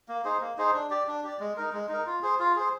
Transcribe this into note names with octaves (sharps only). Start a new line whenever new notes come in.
A#3
D#4 G#4 C5
A#3
D#4 G#4 C5
D4
G4 D5
D4
G4 D5
G#3
D#4 A#4
G#3
D#4 A#4
F4
G#4 C5
F4
G#4 C5